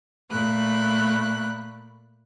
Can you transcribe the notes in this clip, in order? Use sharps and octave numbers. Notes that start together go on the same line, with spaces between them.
A#2 A3 B5 F#6